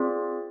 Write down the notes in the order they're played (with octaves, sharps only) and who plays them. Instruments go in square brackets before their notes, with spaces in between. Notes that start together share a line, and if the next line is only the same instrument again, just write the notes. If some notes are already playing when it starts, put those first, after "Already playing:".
Already playing: [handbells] C4 F4 G#4 D5